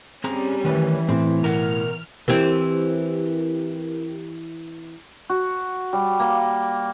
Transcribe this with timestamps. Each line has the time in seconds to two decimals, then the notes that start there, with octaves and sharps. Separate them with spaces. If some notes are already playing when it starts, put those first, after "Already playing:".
0.24 G3 C4 C#4 G#4 A#5
0.64 D#3 E3 A3 B4
1.09 A2 C4
1.42 B2 A#4 F#5 F6
2.28 E3 C4 E4 G4 A#4
5.30 F#4
5.93 G3
6.20 A#3